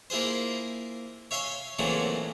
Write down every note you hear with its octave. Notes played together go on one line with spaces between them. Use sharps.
A#3 E4 F4 G#4 C5
C#5 E5 F5 G#5 C6
A#2 C#3 E3 F#3 A3 C4